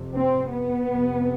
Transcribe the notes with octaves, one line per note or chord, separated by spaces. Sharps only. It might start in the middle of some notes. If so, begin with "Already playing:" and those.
Already playing: F2 C3
C4
B3
F2 C3